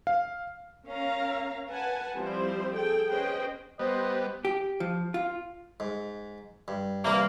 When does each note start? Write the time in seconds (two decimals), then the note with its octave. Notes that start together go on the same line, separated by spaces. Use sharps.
0.07 F5
0.86 C#4 A#4 F5 A#5
1.69 B4 F#5 G#5 A5
2.17 F3 G3 C4 E4 C5
2.75 G#4 A4 G5
3.09 C#4 G#4 B4 C5 D#5 G5
3.79 G3 B3 C5 D#5
4.45 G4
4.80 F3
5.14 F4
5.80 G#2
6.68 G2
7.05 C3 E3 G3 A#3